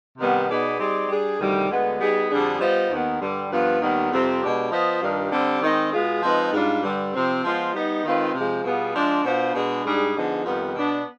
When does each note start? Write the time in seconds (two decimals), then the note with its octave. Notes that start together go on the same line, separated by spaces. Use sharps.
0.18 C3 D#3 G3 B3
0.48 B2 B3 D#4 G#4 D5
0.79 G3 C4 D#4 G#4 D5
1.08 G3 D4 G#4
1.40 D2 C3 D#3 G3
1.70 D2 D3 G#3 B3
2.00 G3 B3 D#4 G#4
2.30 F2 D3 G3 D4 G#4
2.60 G3 B3 F4 C5 D#5
2.90 D#2 D#3 B3
3.20 G2 D3 G3
3.51 G2 F3 B3 F4 B4
3.81 D#2 D#3 G3 B3
4.11 F2 C3 G3 C4
4.41 B2 G#3 D4 G4
4.71 F3 B3 F4 C5 D#5
5.01 G2 D#3 G3 D4 F4
5.32 D3 G3 C4 G4 D5
5.62 D#3 G#3 C4 D#4
5.92 B2 G#3 B3 F4 G#4
6.22 F3 G#3 C4 D#4 B4
6.53 G#2 G3 D4 F4
6.83 G2 D3 G3
7.14 C3 F3 C4
7.44 F3 G#3 B3 F4 C5
7.74 G3 B3 D#4
8.04 D#3 G#3 C4 F4 B4
8.34 C3 F3 G#3
8.64 B2 G3 B3 F4 G#4
8.94 F3 G#3 D4
9.24 B2 B3 D4 F4 C5
9.54 B2 G#3 D4 G#4
9.85 G#2 G3 D4 G#4
10.15 D3 F3 B3 D#4 G#4
10.45 F2 D#3 G3 B3
10.75 B2 B3 D4